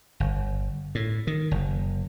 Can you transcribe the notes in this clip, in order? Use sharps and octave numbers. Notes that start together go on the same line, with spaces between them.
G1
A2
D#3
F#1